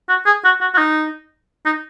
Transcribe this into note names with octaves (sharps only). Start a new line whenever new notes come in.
F#4
G#4
F#4
F#4
F#4
D#4
D#4